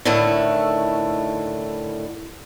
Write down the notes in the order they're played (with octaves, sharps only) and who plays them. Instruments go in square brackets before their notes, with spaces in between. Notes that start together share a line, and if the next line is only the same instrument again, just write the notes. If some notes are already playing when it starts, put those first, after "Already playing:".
[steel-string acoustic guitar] A2 D3 D#3 A3 E4